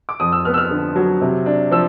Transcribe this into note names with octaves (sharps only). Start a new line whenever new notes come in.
D6
F2 D#6
E6
B3 F6
E6
F6
D3
F#3
C3
D4
F3 E6